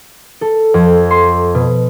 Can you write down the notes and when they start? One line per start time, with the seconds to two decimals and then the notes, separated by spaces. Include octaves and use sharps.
0.41 A4
0.74 F2
1.11 C6
1.55 B2